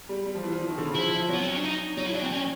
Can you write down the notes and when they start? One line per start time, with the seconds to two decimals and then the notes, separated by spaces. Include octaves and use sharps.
0.09 G3
0.26 G3
0.35 F3
0.43 E3
0.52 F3
0.60 E3
0.69 D#3
0.78 D3
0.85 C#3
0.95 F3 E4
1.11 F3
1.29 F#3 B3
1.41 C4
1.48 C#4
1.56 D4
1.64 D#4
1.97 F#3 D#4
2.06 E4
2.14 D4
2.23 C4
2.32 C#4